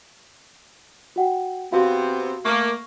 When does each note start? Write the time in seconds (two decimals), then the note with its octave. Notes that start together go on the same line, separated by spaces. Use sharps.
1.16 F#4 F#5 G5
1.72 C3 B3 C4 F#4 F5
2.45 A3 A#3 C#6 F6